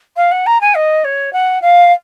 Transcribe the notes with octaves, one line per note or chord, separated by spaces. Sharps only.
F5
F#5
A#5
G#5
D#5
C#5
F#5
F5